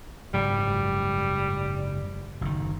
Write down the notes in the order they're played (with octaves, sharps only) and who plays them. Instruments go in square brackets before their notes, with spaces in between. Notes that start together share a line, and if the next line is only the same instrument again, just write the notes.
[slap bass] F#1 G#2 F#3 [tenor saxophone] G3
[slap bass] F#1 A2 D#3